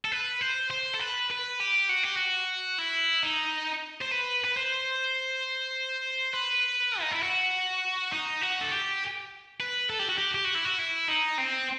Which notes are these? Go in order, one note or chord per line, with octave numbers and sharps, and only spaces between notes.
A4
B4
C5
C5
A4
B4
B4
G4
F#4
G4
F#4
E4
D#4
C5
B4
B4
C5
B4
D#4
E4
F#4
D#4
F#4
A4
G4
B4
A4
G4
F#4
G4
G4
F#4
E4
F#4
E4
D#4
C4